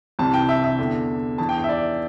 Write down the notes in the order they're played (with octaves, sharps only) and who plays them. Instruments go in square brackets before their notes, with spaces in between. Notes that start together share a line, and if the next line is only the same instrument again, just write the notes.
[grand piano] C2 C3 E3 A5
G5
E5
E5
E2 D3
E2 E3 A5
G5
G5
E5
D5